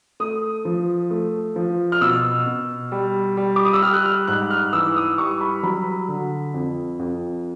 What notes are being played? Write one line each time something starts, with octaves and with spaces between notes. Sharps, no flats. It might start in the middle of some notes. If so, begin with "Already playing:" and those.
A3 D#6
F3
A3
F3
F6
B2 E6
B2
G3
G3
D6
D#6
E6
G3 F6
F#6
F6
G#2 F#6
F6
E3 E6
D#6
G3 C#6
B5
F#3 B5
D3
F2
F2